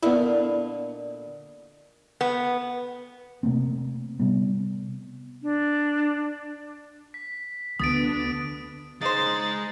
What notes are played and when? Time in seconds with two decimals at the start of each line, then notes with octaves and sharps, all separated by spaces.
0.03 A#2 D3 B3 D#4 E4
2.21 B3
3.43 C3 A3 A#3 C4
4.20 C3 G3 B3
5.43 D4
7.14 B6
7.80 D2 B3 D4 D#6 A6 D7
9.01 C#3 G#3 D#4 C5 A6